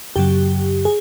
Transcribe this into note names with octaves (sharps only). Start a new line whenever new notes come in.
F#2 C#3 F#3 G4
G#4